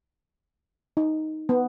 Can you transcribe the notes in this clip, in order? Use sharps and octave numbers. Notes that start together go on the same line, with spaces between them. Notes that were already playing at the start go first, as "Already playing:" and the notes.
D#4
B3